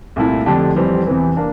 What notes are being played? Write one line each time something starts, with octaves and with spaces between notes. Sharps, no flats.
C2 A#2 A3 E4
F2 D3 A3 D4 G4
F2 E3 G3 C4
E2 C3 E3
A#3 D4